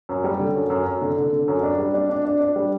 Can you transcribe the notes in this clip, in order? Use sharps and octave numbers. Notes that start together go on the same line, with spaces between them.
F#2
G3
D3
F#2
F#2
F#2
D3
D3
D3
F#2
D4
G3
D4
D4
D4
D4
G3